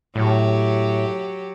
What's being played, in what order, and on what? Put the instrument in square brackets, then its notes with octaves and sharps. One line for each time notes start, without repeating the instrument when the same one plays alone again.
[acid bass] A2 [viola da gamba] F#3 G4